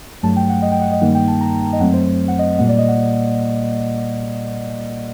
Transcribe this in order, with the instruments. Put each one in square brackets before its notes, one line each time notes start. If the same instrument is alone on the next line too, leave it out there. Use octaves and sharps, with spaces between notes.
[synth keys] G2 F#3 A3 A5
G5
F#5
D#5
G5
F#5
D#5
G2 D#3 G3 A#3 D#4 F#5
G5
A5
A#5
A#5
D#5
F#2 F#3 A3 C4 F#5
C5
C5
F#5
D#5
D#5
A#2 G3 A#3 F#5
D5
D#5
F#5